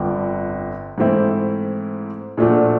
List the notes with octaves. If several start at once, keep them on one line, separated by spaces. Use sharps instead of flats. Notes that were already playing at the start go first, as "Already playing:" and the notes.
Already playing: G1 F2 D3 G3
G#2 E3 A3 C4 E4
A#2 F3 A3 D4 F#4